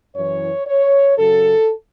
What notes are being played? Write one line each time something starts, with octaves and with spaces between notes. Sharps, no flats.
F#2 E3 C#5
C#5
F#2 C#3 F#3 A4